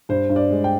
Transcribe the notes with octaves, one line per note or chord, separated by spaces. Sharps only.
G2 C5
G2
D5
G#3
G5